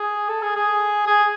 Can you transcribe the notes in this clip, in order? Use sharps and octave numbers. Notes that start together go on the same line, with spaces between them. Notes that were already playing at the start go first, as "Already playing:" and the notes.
Already playing: G#4
A4
G#4
G#4
G#4